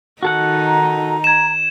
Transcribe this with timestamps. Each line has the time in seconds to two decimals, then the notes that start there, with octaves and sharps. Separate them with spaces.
0.23 D#3 D#4 F#4 A4 F#5
0.66 A#5
1.24 G#6 E7